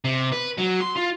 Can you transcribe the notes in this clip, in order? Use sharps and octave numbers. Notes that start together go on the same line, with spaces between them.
C3
B4
F#3
C6
F4